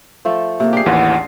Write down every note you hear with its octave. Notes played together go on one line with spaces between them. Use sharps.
F3 A3 A4
C3 A#3
D4 G4 G#4 C7
A1 D#2 E3 F4 F#5